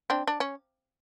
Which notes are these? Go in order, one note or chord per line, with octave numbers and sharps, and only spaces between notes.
C4 D4
D4
C#4